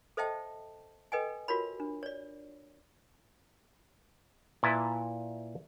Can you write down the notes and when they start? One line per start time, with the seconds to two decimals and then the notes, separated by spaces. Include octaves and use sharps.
0.17 A4 C5 D#5 E5 G5 A5
1.12 A4 B4 D#5 G5 G#5
1.48 F4 F#4 A#4 C#5 B5
1.80 D4
2.03 C#5 D5
4.63 A#2 E4 B4 E5 A5